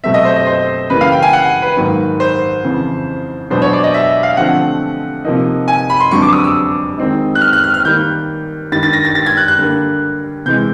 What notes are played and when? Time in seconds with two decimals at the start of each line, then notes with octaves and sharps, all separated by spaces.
0.04 B2 F#3 A3 C4 E5
0.14 D#5
0.25 C5
0.36 D#5
0.47 C5
0.90 C#3 E3 G3 A#3 C#4 B4
1.01 F5
1.12 G5
1.22 G#5
1.33 F#5
1.62 B4
1.77 G#2 D#3 F#3 A#3
2.20 C5
2.64 F2 C#3 E3
3.50 E2 B2 F#3 B3 D4 C5
3.62 C#5
3.73 D5
3.84 D#5
3.94 E5
4.23 F5
4.37 D3 F3 A3 C4 F#5
5.25 C3 F3 A#3 D#4
5.68 G#5
5.90 B5
6.00 C6
6.11 F2 D3 F#3 B3 D4 C#6
6.22 D6
6.33 D#6
6.44 E6
6.98 D#3 G#3 C4 D#4
7.35 F#6
7.41 F6
7.53 F#6
7.64 F6
7.74 F6
7.85 D#3 G3 A#3 G6
8.72 G2 D#3 G3 A6
8.83 A6
8.93 A#6
9.05 A6
9.15 A6
9.26 G#6
9.37 F#6
9.48 F#6
9.59 D3 G3 A#3
10.45 C3 E3 G#3 G6